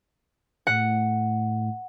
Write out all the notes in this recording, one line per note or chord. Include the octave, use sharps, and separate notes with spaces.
A2 F#5